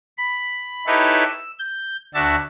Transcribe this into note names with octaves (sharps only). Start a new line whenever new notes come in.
B5
D#4 E4 G4 A4 B4 C#5
E6
G6
D2 D4 F#4 E5 A5